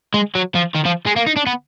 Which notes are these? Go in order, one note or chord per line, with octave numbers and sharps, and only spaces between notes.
G#3
F#3
F3
D#3
F3
G#3
A#3
D#4
D4
B3